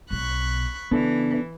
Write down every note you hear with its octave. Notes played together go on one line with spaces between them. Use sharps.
B1 B2 B5 C#6 F#6
C#3 E3 B3 D4 A4